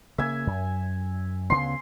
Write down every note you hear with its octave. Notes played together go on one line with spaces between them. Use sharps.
C#3 A#3 E5 G#5
F#2
D2 C#3 B3 C6